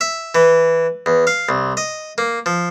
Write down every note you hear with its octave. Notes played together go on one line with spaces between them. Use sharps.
E5
E3
E2
F5
C2
D#5
A#3
F3